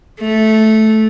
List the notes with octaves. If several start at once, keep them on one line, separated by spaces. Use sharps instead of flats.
A3